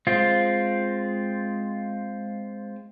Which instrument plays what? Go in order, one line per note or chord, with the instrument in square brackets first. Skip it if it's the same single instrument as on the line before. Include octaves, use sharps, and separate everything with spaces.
[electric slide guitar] G#3 C4 F4